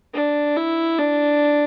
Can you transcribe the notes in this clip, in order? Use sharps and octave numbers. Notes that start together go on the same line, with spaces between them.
D4
E4
D4